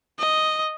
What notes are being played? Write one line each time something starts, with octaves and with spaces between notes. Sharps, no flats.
D#5